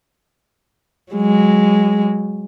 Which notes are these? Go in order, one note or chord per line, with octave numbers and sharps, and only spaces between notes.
F#3 G#3